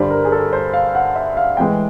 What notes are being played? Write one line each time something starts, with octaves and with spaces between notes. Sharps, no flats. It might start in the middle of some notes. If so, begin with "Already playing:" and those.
Already playing: G2 D3 G3 C5
A#4
G#4
A4
C5
F5
F#5
E5
F5
A2 E3 G#3 G5